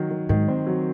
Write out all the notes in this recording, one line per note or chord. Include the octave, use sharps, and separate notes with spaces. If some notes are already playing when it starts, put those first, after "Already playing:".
Already playing: D#3 F#3
D#3
G#2 D#3
C4
F#3